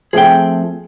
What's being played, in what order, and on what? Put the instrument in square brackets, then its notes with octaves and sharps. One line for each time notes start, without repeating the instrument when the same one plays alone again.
[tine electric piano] F3 A3 C4 [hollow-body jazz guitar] G#4 G5